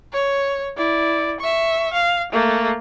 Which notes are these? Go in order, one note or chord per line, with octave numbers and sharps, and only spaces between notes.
C#5
E4 D5
E5 C#6
F5
A3 A#3